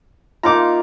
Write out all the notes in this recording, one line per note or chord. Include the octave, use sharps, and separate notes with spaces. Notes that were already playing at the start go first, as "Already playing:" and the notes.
A#3 D#4 F4 A#5 D6